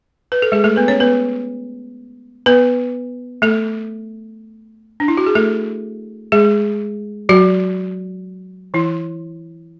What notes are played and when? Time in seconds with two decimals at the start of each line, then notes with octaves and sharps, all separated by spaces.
0.32 B4
0.42 A4
0.52 G#3 G#4
0.64 A3 A4
0.76 B3 B4
0.88 C#4 C#5
1.00 B3 B4
2.46 B3 B4
3.42 A3 A4
5.00 D4
5.08 E4
5.17 F#4
5.26 G#4
5.35 A3 A4
6.32 G#3 G#4
7.29 F#3 F#4
8.74 E3 E4